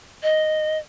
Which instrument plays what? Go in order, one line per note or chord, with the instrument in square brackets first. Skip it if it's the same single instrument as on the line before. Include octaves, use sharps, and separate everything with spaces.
[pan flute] D#5